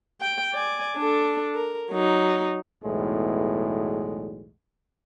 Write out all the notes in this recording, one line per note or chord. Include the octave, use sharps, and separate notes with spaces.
G5
D5 G#5
D4 A4
A#4
F#3 D#4
B1 E2 A2 G#3